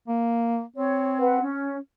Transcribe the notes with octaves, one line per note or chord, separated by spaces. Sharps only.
A#3
C4 C#5
B4 F#5
C#4